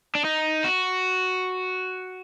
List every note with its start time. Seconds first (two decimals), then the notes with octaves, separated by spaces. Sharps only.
0.15 D4
0.25 D#4
0.64 F#4